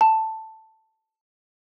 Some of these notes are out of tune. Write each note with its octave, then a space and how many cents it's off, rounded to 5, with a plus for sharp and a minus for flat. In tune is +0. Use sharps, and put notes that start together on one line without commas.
A5 +5